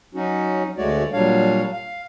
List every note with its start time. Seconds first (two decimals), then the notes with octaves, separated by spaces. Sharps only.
0.15 F#3 C#4 D#4 F#4
0.77 D2 G#3 A3 F#4 C#5 D5
1.13 A#2 F#3 G3 D4 C#5 F5
1.72 F5